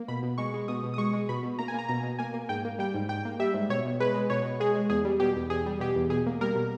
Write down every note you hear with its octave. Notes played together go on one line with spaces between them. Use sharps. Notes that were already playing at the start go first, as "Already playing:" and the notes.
Already playing: A#3
B2 B5
B2
G#3 C#6
G#3
B2 D#6
B2
D#6
G#3 C#6
G#3
B2 B5
B2
A#3 A#5
G#5
A#3 A#5
B2 A#5
B2
A#3 G#5
A#3
G#2 G5
A#3
G3 G5
G#2
G#2 G5
A#3
G3 E5
G#2
B2 C#5
B2
G#3 B4
G#3
B2 C#5
B2
G#3 G#4
G#3
E2 G#4
G3
B2 G4
E2
E2 G#4
G3
B2 G4
E2
B2 G#4
A#3
G3 A#4
B2